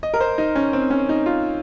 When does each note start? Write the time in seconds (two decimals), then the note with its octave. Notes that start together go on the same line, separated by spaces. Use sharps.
0.03 D#5
0.14 A#4
0.21 C5
0.38 D#4
0.55 C#4
0.73 C4
0.90 C#4
1.09 D#4
1.26 F4